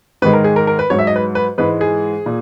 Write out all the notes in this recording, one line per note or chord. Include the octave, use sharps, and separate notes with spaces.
G#2 D#3 G#3 B4
A#4
G#4
A#4
A#4
B4
G#2 F#3 C#5
E5
D#5
B4
B4
G#2 E3 G#3 B4
G#4
A#2